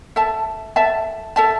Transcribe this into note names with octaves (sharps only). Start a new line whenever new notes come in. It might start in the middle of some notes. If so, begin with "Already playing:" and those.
A4 E5 A5
A4 E5 A5
A4 E5 A5